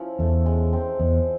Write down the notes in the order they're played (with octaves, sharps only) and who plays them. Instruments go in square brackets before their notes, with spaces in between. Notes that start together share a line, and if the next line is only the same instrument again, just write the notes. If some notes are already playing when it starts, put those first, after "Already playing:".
Already playing: [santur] F3 C#4 E4
[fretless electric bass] E2 [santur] A3
[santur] G#3
C4
[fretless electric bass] E2 [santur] G#3